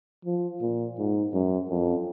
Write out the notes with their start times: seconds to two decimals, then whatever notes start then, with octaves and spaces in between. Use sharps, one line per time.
0.25 F3
0.61 A#2
0.98 G#2
1.33 F#2
1.69 F2